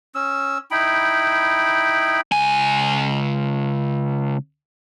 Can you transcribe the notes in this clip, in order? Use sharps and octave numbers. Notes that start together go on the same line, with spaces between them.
C#4 E6
D#4 E4 G5 B5
C#2 G#5